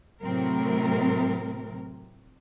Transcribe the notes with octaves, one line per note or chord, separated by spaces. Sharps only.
A2 C3 F#3 C4 A#4